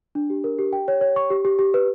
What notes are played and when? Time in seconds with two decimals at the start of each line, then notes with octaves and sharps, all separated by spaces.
0.15 D4
0.30 G4
0.44 A#4
0.59 G4
0.73 G5
0.88 C#5
1.01 C#5
1.16 C#6
1.30 G4
1.45 G4
1.59 G4
1.74 B4